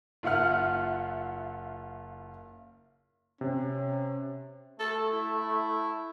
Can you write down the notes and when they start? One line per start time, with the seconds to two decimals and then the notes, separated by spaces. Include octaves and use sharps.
0.23 F#1 F4 E5 F#5 F6
3.41 C3 C#4
4.80 A3 A4
5.12 E4